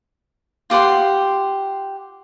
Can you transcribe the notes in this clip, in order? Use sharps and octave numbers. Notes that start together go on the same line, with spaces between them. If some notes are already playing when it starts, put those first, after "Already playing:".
F4 G4 F#5 C6